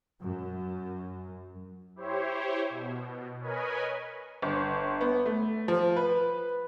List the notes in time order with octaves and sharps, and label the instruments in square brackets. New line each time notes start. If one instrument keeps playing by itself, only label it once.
[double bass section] F#2
[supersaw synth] E4 G4 C5 C#5
B2
A#4 B4 C#5 D#5 G#5 B5
[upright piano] G1
B3
A3
F3
B4